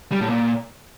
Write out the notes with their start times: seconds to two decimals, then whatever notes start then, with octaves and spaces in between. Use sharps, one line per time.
0.12 G3
0.21 A2
0.29 A#2